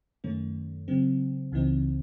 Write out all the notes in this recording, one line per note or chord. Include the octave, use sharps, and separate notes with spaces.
F#2 D#3 A3 C#4
C#3 F#3 C4
C#2 C#3 E3 C4 D#4